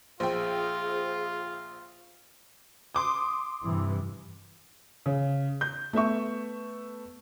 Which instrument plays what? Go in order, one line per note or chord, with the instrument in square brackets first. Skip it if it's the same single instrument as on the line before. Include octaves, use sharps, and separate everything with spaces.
[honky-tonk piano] A#1 G5 [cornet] F4 [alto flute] G#4 [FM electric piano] C5
[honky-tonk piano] C6 D6 D#6
[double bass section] G2 C3 E3
[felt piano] C#3
G6
A3 B3 E5 C#6